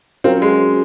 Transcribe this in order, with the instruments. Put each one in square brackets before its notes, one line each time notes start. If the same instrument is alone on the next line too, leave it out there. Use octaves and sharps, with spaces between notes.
[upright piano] F#3 C#4 F4 A#4 F5 [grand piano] C4
[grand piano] G#3